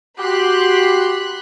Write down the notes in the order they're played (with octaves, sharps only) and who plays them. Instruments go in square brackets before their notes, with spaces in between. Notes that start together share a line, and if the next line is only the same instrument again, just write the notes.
[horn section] F#4 G4 [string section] B5 C6 F#6